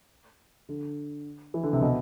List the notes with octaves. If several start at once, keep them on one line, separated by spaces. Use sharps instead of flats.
D3
E3
D3
C3
B2